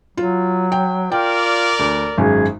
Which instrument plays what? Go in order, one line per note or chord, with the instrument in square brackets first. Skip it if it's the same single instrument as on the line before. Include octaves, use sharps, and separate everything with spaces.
[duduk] F#3 [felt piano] F4
[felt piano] G5
[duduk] F4 [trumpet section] A#4 D5 [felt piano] G5
[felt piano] D2
[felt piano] G#1 F#2 G#3 [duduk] G#4